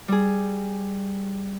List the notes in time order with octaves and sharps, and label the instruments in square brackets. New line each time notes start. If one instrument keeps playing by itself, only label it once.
[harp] G3 G#4